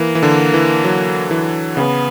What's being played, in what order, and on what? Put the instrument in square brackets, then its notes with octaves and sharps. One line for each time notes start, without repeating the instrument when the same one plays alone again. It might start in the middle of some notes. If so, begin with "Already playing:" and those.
Already playing: [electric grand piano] E3 [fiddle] A#3
[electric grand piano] E3
D3
E3
F#3
E3
[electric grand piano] C#3 [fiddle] B3